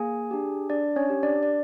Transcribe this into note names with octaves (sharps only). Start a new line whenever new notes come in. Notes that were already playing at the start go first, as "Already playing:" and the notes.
Already playing: A#3 G#4 G#5
D4 G4
D4 D5
C#4 C#5
G4
D4 D5
D5